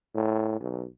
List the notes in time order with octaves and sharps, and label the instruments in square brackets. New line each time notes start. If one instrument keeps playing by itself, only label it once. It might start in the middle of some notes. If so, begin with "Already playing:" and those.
[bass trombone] A2
B1